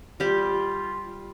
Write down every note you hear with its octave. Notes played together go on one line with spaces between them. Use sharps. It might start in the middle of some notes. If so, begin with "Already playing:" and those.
G3 F4 G4